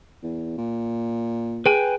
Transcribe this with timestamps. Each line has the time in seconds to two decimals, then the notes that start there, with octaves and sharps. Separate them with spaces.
0.23 E2
0.58 A#2
1.66 G#4 B4 G5 G#5